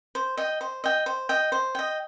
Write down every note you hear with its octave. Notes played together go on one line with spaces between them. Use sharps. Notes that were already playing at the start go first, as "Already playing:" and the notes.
C5
D#5 G5
C5
D#5 G5
C5
D#5 G5
C5
D#5 G5